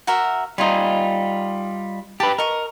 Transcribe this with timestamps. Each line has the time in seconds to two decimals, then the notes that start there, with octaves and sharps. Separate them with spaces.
0.07 F#4 A#4 E5
0.58 G3 D#4 F4 D#5 G#5
2.20 G4 B4 A5
2.38 A#4 D#5 C#6